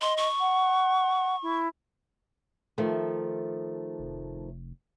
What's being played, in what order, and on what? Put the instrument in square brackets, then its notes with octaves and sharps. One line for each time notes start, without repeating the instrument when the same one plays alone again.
[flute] D#5 [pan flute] C6
[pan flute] C#6
[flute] F#5
E4
[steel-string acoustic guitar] D#3 F3 A3
[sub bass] F1